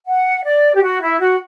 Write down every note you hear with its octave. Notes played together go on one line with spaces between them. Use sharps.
F#5
D5
G4
F#4
E4
F#4